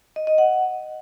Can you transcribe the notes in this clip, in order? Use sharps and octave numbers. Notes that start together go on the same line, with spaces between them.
D#5
D#5
F#5